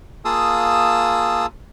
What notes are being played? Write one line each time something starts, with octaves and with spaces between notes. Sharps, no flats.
A#3 F4 G#4 A5 D#6 E6